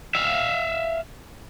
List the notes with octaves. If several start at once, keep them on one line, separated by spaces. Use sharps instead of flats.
E5 F5